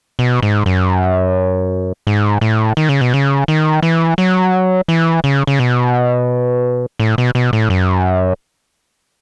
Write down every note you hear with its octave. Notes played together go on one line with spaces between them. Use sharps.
B2
G#2
F#2
G#2
A2
D#3
C#3
B2
C#3
D#3
E3
F#3
E3
C#3
C#3
B2
A2
B2
B2
A2
F#2